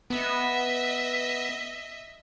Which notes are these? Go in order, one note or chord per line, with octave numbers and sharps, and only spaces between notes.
B3 D#5 E5